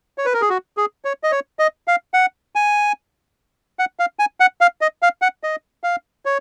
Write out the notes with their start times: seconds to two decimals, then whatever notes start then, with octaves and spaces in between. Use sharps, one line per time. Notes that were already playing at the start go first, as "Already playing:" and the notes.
0.18 C#5
0.25 B4
0.34 A#4
0.41 G#4
0.49 F#4
0.77 G#4
1.05 C#5
1.23 D#5
1.32 C#5
1.59 D#5
1.88 F5
2.14 F#5
2.55 G#5
3.79 F#5
3.99 F5
4.19 G#5
4.40 F#5
4.61 F5
4.81 D#5
5.03 F5
5.22 F#5
5.43 D#5
5.84 F5
6.25 C#5